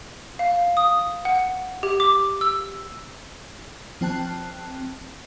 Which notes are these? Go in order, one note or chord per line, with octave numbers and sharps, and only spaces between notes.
F5
D#6
F#5
G4
D6
E6
F3 C4 G5 A5 F#6